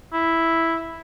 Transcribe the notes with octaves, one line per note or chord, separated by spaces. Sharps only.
E4